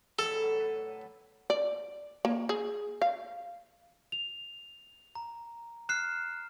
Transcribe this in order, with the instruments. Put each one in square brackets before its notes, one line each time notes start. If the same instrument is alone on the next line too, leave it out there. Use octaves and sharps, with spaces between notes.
[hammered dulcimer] A2 D3 E3 [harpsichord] A4
[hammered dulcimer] F#3
B4
[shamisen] D5
A#3
G#4
F5
[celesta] F7
[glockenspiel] A#5
[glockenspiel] F6 C7 E7 [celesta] F#6